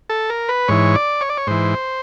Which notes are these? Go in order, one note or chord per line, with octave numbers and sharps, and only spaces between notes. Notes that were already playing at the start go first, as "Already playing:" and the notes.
A4
A#4
B4
G#2 E3 C#5
D5
C#5
D5
C#5
G#2 E3 C5